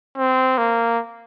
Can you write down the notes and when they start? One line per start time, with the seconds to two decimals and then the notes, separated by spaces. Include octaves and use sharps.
0.18 C4
0.58 A#3